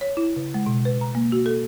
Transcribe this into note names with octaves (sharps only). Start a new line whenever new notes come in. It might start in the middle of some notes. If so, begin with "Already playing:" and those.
C#5
E4
C#3
G#3
B2
B4
A#5
A#3
F#4
A4